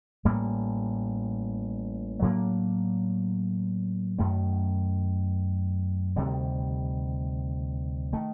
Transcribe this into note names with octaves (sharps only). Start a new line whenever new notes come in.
A1 A2 G3 A#3
A2 F#3 A#3 D4
F#2 D#3 A3
D2 C3 D#3 G3
D#3 A3